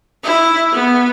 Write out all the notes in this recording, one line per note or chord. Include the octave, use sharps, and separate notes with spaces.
E4
B3